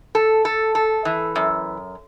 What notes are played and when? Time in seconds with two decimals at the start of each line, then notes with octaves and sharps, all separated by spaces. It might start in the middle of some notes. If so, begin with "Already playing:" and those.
0.15 A4
0.45 A4
0.75 A4
1.05 E3
1.36 F#2